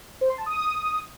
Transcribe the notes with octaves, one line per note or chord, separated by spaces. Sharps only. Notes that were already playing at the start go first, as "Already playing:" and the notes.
C5
C6
A5
D#6